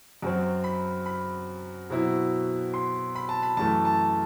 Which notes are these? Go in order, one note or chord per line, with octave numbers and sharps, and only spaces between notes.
F#2 F#3 C4
B5
B5
B2 F#3 C4 E4
C6
B5
A5
B5
F#2 E3 A3 A5
A5